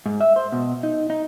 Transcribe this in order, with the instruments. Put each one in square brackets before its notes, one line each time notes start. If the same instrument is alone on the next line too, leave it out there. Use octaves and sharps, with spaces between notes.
[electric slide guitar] G#2
E5
C5
B2
D#4
D#4